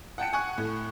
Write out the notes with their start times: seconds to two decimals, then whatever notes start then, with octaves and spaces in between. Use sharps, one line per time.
0.18 F#5 G5 A5 C#7
0.33 F#5 G#5 C#6 F#6
0.58 A2